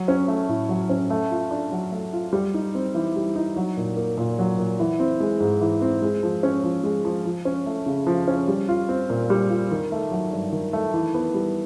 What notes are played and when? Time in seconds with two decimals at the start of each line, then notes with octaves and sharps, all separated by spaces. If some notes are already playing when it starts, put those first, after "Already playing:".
Already playing: F#3
0.08 C#4
0.28 A3
0.49 A2
0.69 F#3
0.90 C#4
1.10 A3
1.31 F4
1.51 D4
1.72 F#3
1.92 A3
2.13 F4
2.33 G3
2.54 D#4
2.75 C4
2.95 E3
3.16 G3
3.36 D#4
3.56 F#3
3.77 A#2
3.97 A#3
4.17 A#2
4.39 F#3
4.58 A#2
4.80 E3
5.00 C4
5.20 G#3
5.40 G#2
5.61 E3
5.82 C4
6.02 G#3
6.23 F3
6.43 C#4
6.64 F3
6.84 G#3
7.05 F3
7.25 F3
7.45 C#4
7.66 A3
7.86 C#3
8.07 F3
8.28 C#4
8.48 G3
8.69 F4
8.89 C4
9.10 A#2
9.30 G3
9.50 F4
9.72 D#3
9.92 A3
10.11 F#3
10.32 G2
10.53 D#3
10.73 A3
10.94 E3
11.14 B3
11.34 G3